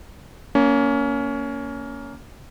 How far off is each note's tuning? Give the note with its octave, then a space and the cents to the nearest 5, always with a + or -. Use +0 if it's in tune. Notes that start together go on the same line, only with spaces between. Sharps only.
A#3 +0 C#4 +20